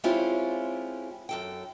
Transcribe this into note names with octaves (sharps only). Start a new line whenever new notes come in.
G#3 C4 C#4 E4 F4 G4
F#2 A4 G5